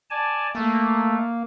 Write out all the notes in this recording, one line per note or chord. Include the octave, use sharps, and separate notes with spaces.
D5 G#5 A5
A3 A#3